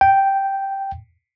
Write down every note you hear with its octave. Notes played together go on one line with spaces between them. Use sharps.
G5